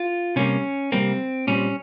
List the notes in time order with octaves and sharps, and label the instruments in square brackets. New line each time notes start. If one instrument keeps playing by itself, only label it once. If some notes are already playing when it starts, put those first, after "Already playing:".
Already playing: [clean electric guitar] F4
C3 G3 A#3 C#4
C3 G3 A#3 C4
A#2 G3 C4 C#4